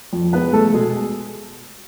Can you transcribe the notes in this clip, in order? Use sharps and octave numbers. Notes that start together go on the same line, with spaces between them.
F2
G#3 B3 B4
G#3 A3 A4
B2 G#3 G#4